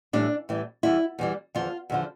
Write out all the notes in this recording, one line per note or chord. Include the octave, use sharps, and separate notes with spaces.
A2 E3 G3 D4
A2 E3 G3
E2 E3 G3 E4
E2 E3 G3
E2 D3 F3 F4
E2 D3 F3